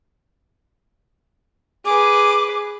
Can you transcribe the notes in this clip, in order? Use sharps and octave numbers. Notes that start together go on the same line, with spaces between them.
G#4 B4 D6